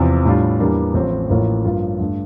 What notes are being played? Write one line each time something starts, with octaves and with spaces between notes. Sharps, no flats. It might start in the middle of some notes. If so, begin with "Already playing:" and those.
Already playing: E2 C3 F3
A2 G3 D4 F4
E2 E3 G3 A#3 D4
A1 A2 F3 C4
A1 A2 F3 A#3 F4
G2 F3 A#3 F4
G2 D3 A3